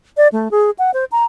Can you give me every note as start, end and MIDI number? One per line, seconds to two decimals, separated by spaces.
0.17 0.28 74
0.32 0.51 57
0.51 0.70 68
0.79 0.91 78
0.94 1.05 72
1.12 1.24 82